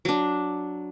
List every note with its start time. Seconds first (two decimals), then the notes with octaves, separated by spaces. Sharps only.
0.05 F#3 D4